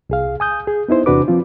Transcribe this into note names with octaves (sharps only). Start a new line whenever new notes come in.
C2 G#4 F5
G#5 D#6 G6
G#4
B3 D#4 E4 C5
E2 C3 D4 F#4 B4 D6
F3 C4 F4